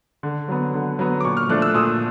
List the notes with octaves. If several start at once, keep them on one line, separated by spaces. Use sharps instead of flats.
D3
F#3 B3
D3
F#3 B3
D6
A#2 C#6
F6
F3 A3 D4 F#6
E6
A#2 D#6